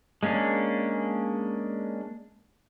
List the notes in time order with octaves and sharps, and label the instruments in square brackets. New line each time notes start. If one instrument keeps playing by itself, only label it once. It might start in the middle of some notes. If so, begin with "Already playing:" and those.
[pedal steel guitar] G#3 A#3 C#4 D4